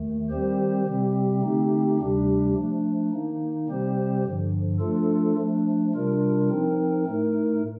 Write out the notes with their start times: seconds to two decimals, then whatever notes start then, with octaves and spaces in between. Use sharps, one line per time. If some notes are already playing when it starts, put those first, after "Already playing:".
Already playing: D#2 D#3 A3
0.30 D#3 G3 C4 G4 C5
0.86 C3 G3 C4 G4
1.42 D3 A3 C4 D#4 G4
1.99 D2 C3 G3 D4 G4
2.54 F3 A3 D4
3.12 D#3 A#3 D#4
3.68 C3 G3 C4 G4 C5
4.24 G2 D3 F3
4.80 F3 A3 D4 F4 A4
5.37 F3 A3 D4
5.94 C3 G3 D4 F4 A#4
6.49 F3 C4 D#4 A#4
7.06 A2 A3 D#4 A#4